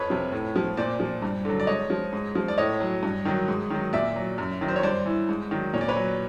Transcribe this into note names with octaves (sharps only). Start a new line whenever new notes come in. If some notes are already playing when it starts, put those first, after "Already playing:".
Already playing: F2 B4 C#5
C3 F3
A2
F3
A#2 C5 D5
F3
G2
D3 F#3
D5
G#2 C#5 D#5
F3
G#2
F3
D5
A2 C#5 D#5
F#3
G2
D#3 F#3
G#2
D#3 F#3
A#2 D5 E5
F#3
F#2
D#3 F#3
C5
C#5
G2 C5 D5
E3
G#2
D#3 F#3
A#2 C#5
D5
B4 C#5
F#3